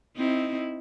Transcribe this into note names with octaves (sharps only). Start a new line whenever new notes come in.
C4 D#4 E4